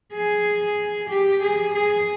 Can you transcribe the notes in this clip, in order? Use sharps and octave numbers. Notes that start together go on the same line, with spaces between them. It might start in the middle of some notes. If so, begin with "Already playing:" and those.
G#4
G4
G#4
G#4